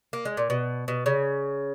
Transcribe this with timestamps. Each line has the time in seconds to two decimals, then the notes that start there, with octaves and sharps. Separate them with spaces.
0.13 A#3
0.25 G#3
0.37 A#2
0.50 B2
0.88 B2
1.06 C#3